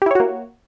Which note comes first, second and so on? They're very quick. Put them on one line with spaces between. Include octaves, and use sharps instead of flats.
G4 E4 C#5 F#4 A#3